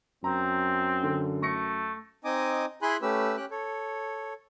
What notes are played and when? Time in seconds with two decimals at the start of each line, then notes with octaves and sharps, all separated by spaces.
0.24 F#2 C4 A#5
1.03 D3
1.42 A3 C#6 A#6 C#7
2.24 C4 D#4 D#5 G#5 D6 D#6
2.82 E4 G#4 G#5 B5 C6 F#6
3.02 A3 C#4 G4 B4 E6
3.37 C#4 G4 G5 F#6
3.51 A4 C#5